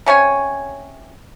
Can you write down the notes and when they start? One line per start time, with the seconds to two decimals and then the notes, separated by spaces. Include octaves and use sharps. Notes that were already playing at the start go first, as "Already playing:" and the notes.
0.06 C3 C#4 C#5 G#5